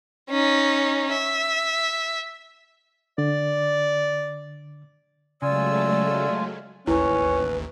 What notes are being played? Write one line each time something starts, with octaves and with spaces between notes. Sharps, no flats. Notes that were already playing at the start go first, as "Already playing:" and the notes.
C#4 D#4
E5
D3 D5
C#3 F#3 G#3 A3 F4 D5 G#5 E6
A1 D#2 C#4 E4 B4